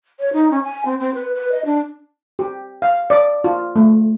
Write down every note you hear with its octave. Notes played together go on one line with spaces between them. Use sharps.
C#5
D#4
C#4
G#5
C4
C4
B4
B4
D#5
D4
G4
F5
D5
F4
A3